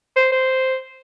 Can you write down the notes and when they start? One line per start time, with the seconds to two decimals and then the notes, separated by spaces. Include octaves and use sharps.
0.16 C5
0.32 C5